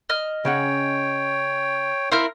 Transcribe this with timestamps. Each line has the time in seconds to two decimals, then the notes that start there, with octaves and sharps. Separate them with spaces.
0.09 D#5 F6
0.45 C#3 C#4 C#5 F#5 G5
2.12 C4 E4 A#4 F5 F6